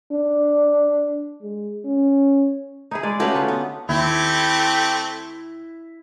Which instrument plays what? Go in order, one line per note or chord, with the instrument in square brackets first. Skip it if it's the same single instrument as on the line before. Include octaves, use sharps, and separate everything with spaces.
[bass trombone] D4
G#3
C#4
[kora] D#4 E4 G#4
G#3 D5
[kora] A3 G4 F5 [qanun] C#4 F#4 B4
[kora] D3 D#4 F4
[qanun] B3
[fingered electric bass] D#2 [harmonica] A3 C4 G4 [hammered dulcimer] E4